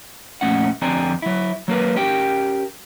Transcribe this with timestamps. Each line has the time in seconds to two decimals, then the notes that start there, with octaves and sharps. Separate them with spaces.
0.41 F2 A#2 A3 C#4 F#5
0.82 F2 D3 C4 D5 G#5 A#5
1.22 F#3 E4
1.68 F#3 A#3 A#4 B4
1.96 C#4 G4 A#4 G5